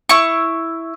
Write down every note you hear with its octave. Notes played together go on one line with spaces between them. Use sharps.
E4 C#6